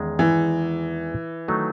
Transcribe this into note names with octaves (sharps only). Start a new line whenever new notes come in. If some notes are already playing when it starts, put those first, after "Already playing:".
Already playing: E2 D#3 G#3 C#4 G#4
E3
D#3 F#3 A3 D#4